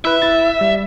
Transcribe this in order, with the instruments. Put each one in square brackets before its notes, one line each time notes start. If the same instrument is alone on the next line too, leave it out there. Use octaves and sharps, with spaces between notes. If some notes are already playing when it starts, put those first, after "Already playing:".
[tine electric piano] E4 B4 [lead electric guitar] E5
[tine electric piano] E4 A6
G3